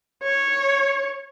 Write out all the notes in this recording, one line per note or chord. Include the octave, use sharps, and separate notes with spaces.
C#5